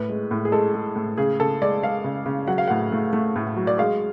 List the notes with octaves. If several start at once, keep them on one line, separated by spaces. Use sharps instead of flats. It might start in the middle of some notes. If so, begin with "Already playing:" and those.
Already playing: A2 B4
G#3
A2
G#4
G#3 A4
G#3
A2
C#3 G#4
C#3 A4
G#3 D5
G#3 F5
C#3
C#3
F#3 F#5
F5
A2 F#5
A3
A3
A2
F#3
D5
G#3 F5